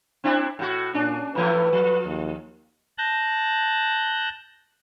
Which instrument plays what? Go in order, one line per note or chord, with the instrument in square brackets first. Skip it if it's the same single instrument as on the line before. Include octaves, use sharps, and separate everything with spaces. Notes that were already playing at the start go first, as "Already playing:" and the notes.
[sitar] C4 D4 E4
A2 F#4
[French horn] A#2 [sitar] C#4 D4
[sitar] A2 E3 A3 [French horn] B4
[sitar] F3
[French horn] D#2
[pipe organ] A5 F#6 G6 A#6